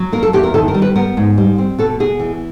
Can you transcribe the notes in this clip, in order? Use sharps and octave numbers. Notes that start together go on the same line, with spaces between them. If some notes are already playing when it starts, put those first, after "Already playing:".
Already playing: F#3
A#3 A#4
A4
E2 G4
A#4
D#3 A4
A#4
G3
B4
B3 A#4
G#2
G3
C4
B2 A4
B2 G#4
E3